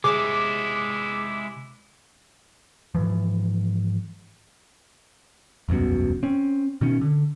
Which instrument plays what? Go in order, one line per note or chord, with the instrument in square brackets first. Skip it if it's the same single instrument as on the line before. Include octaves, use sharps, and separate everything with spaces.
[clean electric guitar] C3 C#5 G#5 [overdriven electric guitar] G#3 E4 [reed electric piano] G#4 [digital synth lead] D6
[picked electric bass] G#2 C#3 E3 F3
E1 C2 F#2 B2
C4 C#4
B2 D#3 C#4
D3